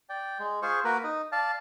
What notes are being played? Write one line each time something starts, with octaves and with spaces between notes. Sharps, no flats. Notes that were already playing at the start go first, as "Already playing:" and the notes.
D5 G5
G#3
F4 G#4 C5 C#6
A#3 F#4 A#4 B4
D#4 D#5
D5 F5 A5